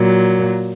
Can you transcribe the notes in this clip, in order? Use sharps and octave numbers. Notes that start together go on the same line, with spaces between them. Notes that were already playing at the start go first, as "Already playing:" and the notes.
Already playing: A#2 F#3